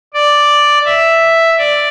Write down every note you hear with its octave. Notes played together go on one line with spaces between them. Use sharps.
D5
E5
D5